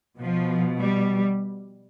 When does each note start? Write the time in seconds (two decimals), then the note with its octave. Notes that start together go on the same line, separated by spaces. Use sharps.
0.19 B2 F3
0.79 G3